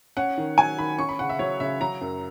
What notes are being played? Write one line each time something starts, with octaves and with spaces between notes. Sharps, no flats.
C#4 F#5
D#3
F#3 G#5
D#3 B5
C#4 C#6
B5
C#3 F#5
E5
F#3 C#5
C#3 E5
F#3 A#5
F#2